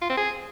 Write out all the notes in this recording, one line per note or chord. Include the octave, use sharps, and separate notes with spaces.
F4
C4
G#4